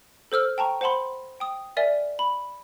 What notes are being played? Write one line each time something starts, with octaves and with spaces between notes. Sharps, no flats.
A4 C5 E6 F6
G5 A5 A#5 C#6
C5 F#5 A5 B5 C6
G5 D#6
A#4 D5 E5 G#5
B5